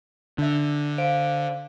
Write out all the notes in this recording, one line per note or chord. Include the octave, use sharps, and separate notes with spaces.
D3 D4 E5
C5 F5 D7